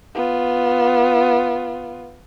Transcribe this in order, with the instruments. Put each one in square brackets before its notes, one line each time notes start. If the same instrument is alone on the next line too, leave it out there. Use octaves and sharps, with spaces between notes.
[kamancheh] B3 F4